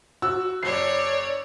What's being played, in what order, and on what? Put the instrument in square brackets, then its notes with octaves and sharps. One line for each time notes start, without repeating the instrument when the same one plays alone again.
[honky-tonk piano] F#4 [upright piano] E6
[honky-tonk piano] F#1 [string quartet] C#5 D5 [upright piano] C7